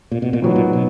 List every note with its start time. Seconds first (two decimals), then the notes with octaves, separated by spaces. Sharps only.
0.12 A#2
0.22 B2
0.33 A#2
0.42 G#2 B2 F#3 B3
0.56 A#2
0.73 B2